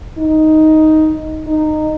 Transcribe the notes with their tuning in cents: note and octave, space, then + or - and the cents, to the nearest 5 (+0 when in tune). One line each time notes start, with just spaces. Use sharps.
D#4 +5
D#4 -15